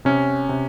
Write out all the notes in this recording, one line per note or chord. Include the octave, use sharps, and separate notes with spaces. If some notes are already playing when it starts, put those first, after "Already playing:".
C3 C#4
C3